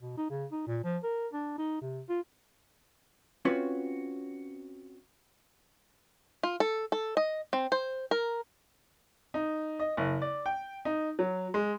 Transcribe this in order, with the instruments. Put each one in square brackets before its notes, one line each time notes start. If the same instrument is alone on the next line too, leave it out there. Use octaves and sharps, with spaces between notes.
[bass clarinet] B2
D#4
C#3
D#4
A#2
F3
A#4
D4
D#4
C3
F4
[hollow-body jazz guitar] C4 C#4 F4 F#4 B4 C#5
[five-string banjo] F4
A4
A4
D#5
C4
C5
A#4
[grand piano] D#4
D#5
F#1
D5
G5
D#4
F#3
G#3